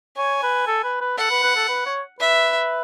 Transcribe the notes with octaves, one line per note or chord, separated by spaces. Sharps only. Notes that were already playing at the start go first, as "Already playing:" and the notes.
C#5 G#5
B4
A4
B4
B4
A4 F#5
B4
B4
A4
B4
C#5
B4 E5